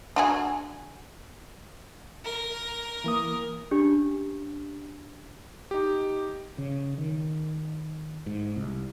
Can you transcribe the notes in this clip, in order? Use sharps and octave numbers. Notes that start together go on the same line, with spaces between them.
D4 F#4 G#4
A#4
E3 A#3 D#6
C#4 D4 G4 G5
D#4 G4
C#3
D#3
G#2
C2